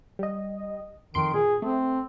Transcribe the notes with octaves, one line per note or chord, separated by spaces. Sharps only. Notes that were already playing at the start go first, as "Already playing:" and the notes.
G3 D#5
F2 D#3 C6 D7
A#2 G#4
A3 C4